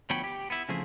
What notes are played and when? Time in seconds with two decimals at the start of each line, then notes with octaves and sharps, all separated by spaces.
0.10 D2 F3 B3 C#5 G5 B5
0.24 G4
0.50 B3 E4
0.69 C#3 E3 F3 A3 C4 G#4